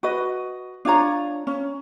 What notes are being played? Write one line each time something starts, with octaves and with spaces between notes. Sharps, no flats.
F#4 B4 D#5
D4 F4 C#5 A#5
C#4